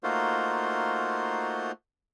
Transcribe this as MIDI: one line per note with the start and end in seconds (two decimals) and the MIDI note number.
0.03 1.72 57
0.03 1.72 58
0.03 1.72 63
0.03 1.72 65
0.03 1.72 66
0.03 1.72 72